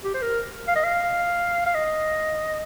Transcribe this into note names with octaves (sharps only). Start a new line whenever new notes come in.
G4
C5
A#4
F5
D#5
F5
F5
D#5